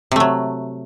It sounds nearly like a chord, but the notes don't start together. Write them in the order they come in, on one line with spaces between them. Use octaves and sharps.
C3 A3 F#3